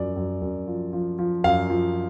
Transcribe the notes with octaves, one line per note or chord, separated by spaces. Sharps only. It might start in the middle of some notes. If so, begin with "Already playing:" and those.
Already playing: F#2 F3 D5
F#2
F#2
F3
F3
F3
F#2 F5
F3